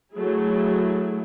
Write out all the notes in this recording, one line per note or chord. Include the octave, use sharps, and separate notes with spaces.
F#3 A3 E4 G#4